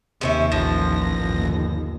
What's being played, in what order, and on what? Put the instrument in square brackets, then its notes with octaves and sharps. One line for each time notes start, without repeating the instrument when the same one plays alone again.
[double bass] D#2 [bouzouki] C3 C#4 E5
[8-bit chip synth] A1 A#6 [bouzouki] F3
[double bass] G1 D#2